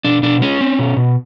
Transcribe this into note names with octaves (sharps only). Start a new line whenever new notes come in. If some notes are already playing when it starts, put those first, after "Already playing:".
B2 D4
B2 D4
G#3 C#4
C4
B2
B2